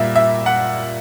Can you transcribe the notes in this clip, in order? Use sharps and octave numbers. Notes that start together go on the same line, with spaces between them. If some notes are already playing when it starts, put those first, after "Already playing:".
Already playing: A#2 G3 A#3 E5
E5
F#5